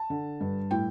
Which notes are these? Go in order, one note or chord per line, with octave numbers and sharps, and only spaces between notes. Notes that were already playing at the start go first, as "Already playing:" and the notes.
Already playing: A5
D3
G2
A2 G5